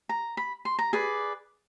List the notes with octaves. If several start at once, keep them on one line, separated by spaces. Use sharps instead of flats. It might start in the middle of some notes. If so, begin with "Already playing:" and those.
A#5
B5
C6
A#5
G#4 B4 D5